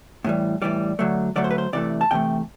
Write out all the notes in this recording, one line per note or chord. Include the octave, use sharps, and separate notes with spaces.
A2 E3 G3
A2 E3 G3 D5
D3 F#3 A3
D3 F#3 A3 D5
C5
B4
C5
C3 E3 A3 D5
A5
C3 E3 A3 G5